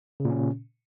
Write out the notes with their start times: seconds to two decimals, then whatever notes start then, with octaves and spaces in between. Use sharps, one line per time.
0.20 C#3
0.25 A#2
0.30 C#4